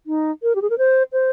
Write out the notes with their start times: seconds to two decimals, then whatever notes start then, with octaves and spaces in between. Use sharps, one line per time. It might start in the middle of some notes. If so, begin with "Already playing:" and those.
0.06 D#4
0.43 A#4
0.55 G4
0.62 G#4
0.70 A#4
0.78 C5
1.13 C5